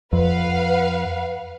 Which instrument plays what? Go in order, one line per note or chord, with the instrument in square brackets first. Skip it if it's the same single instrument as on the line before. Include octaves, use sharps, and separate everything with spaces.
[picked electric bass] F2 [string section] B4 F5 F#5